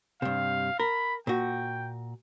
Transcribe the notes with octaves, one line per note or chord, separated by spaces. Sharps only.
G2 C3 F5
A#4 B5
A#2 F#4 G5